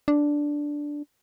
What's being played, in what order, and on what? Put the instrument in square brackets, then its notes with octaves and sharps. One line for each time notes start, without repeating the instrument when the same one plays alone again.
[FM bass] D4